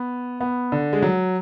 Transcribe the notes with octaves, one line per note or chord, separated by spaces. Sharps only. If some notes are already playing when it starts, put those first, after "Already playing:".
Already playing: B3
B3
D3
G#3
F#3